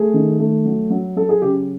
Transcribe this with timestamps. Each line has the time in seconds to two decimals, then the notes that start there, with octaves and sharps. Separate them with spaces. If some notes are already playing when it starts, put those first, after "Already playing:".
Already playing: A3 G#4
0.14 D#3
0.40 A3
0.65 F#3
0.90 F#3
1.16 F#3 A4
1.29 G#4
1.42 C#3 G4